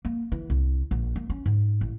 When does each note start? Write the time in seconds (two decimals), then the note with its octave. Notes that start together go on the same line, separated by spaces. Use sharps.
0.05 A#3
0.32 E3
0.50 C2
0.91 A#1
1.16 A#3
1.30 C#4
1.46 G#2
1.81 A1